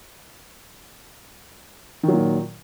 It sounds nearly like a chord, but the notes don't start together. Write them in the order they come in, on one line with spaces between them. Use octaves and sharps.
D#3 F#3 A#2